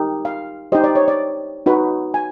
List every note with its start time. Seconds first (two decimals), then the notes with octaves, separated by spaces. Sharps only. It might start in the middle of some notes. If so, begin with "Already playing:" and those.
Already playing: D#4 G4 A#4
0.25 F5
0.72 D#4 G4 C5 D#5
0.84 D5
0.95 C#5
1.08 D5
1.66 D#4 F#4 B4
2.14 G#5